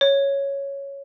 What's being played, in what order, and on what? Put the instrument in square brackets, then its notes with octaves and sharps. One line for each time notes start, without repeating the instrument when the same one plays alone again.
[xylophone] C#5